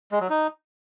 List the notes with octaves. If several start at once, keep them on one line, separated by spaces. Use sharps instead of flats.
G#3
F#3
D#4